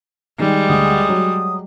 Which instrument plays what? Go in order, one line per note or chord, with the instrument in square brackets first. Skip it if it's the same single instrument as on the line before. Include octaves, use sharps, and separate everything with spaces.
[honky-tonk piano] D#3 [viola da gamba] G3 G#3
[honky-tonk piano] D2 [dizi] D#6
[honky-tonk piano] F#3